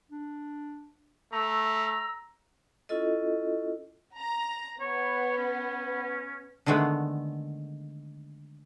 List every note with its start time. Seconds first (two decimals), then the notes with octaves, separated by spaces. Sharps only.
0.11 D4
1.33 A3 A#5 E6
2.89 C#4 E4 F4 A4 D#5
4.18 A#5
4.80 B3 C#5
5.38 C#4
6.66 D3 D#3 G#3 A3 B3